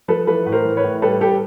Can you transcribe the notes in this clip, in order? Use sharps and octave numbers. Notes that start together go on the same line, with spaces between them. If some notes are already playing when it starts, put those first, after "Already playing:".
F3 A4 B4
E3 A4 B4
A2 B4
A#4 C5
E3
B4 C#5
A2
G3 A4 B4
G3 G4 A4